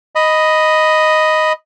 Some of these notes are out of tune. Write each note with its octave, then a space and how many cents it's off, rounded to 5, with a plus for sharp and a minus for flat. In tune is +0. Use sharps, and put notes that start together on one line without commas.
D#5 +0 B5 +0